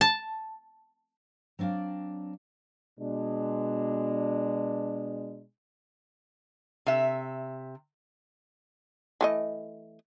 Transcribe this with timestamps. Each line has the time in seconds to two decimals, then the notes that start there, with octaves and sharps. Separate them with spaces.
0.01 A5
1.59 F#3 C4 D4 D5 F5
3.00 B2 G#3 D4
6.86 C3 E5
9.21 E3 A3 D#5